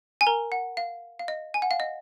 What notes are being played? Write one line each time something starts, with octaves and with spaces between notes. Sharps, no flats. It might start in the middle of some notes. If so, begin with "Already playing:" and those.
G#5
A#4 A#5
F#5
F5
F5
D#5
G#5
F#5
F5
D#5